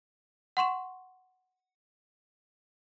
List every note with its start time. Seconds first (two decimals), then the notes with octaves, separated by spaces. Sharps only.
0.57 F#5 C6 C#6 E7